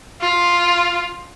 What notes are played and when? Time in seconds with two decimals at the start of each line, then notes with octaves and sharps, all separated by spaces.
0.21 F4